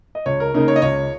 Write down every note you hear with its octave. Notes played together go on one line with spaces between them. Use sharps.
D#5
C#2 C#5
A#4
C#3 A#3 D#4 A#4
C#5
D#5
C#2 C#5